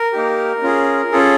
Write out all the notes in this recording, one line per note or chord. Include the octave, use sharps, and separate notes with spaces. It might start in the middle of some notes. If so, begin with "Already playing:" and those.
Already playing: A#4
A#3 D#4 G4
C#4 F4 G#4
C#4 F4 G#4 A4